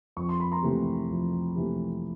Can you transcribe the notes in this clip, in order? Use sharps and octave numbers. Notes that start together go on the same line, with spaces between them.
F2 C#6
C6
B5
A#5 C6
C3 E3 A3
F2
C3 E3 A3